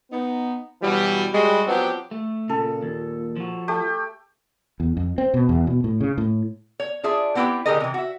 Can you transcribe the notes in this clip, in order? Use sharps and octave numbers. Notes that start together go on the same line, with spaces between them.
B3 D#4
B2 E3 F#3 G3
G3 G#3 F#4
F3 F#3 B3 C4 D4 G4
A3
A#2 C#3 A4
D#2
F3 F#4
A3 G4
E2
F2
C4
B2
E2
B2
A2
C#3
A2
C#5
D4 F4 G#4 E5
B3 C4 E4 F4 G4 B4
A2 D3 G4 G#4 A#4 D#5
C3 E3
F#4 E5